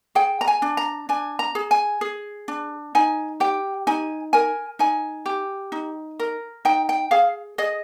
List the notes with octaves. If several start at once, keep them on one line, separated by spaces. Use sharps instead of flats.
G#4 G5
A#5
G#5
D4
A#5
D4 G#5
A#5
G#4
G#5
G#4
D4
D#4 G#5
G4 G5
D#4 G#5
A#4 G#5
D#4 G#5
G4
D#4
A#4
D#4 G5
G5
G#4 F5
G#4 D#5